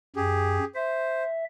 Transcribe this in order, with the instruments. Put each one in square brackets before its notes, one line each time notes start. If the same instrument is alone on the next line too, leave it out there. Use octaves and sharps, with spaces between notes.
[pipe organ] F#2 [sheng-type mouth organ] G4 G#4
[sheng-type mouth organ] C5 [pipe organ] E5